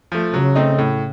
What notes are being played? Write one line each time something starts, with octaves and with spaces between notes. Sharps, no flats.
F3 A3
C#3 F#3
A3 C4 D#4
A2